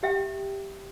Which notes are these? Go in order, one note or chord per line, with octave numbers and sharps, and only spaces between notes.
G4 E5 G5